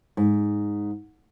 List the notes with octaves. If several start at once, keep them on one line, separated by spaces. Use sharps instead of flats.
G#2